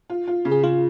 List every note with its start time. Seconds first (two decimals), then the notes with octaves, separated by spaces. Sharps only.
0.10 F4
0.28 F4
0.45 C#3
0.51 G#4
0.63 C#3 F4